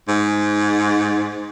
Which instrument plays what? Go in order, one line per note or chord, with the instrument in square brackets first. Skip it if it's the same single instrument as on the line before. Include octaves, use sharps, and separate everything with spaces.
[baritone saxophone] G#2